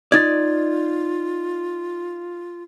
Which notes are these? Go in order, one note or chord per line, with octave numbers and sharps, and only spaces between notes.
D#4 F4 D5 G#6 A6